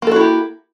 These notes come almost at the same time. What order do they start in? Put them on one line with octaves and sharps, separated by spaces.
A#3 A4 F#4 E4 G4